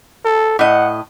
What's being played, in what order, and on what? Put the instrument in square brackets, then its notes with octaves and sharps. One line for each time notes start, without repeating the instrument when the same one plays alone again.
[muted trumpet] A4
[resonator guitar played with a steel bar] A2 D#5 [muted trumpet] F#5